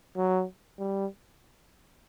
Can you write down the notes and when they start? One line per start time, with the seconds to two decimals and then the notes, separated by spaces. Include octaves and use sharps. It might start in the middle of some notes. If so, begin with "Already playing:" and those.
0.17 F#3
0.78 G3